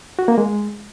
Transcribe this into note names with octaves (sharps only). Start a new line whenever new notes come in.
F#4
A#3
G#3